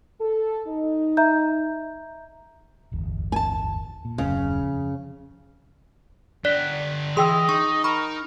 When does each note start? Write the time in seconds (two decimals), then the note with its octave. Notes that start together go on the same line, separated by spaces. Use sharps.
0.21 A4
0.66 D#4
1.17 E5 A#5 G6
2.92 D1 G1 E2
3.32 G#5 A5
4.05 A#2
4.18 D#1 F#2 C#3
4.64 F2
6.45 D3 D5 G5 F#6 B6
7.17 E3 G#4 D#5 G5 C6 E6
7.49 D#4 C#6
7.84 A#4 B5 C#6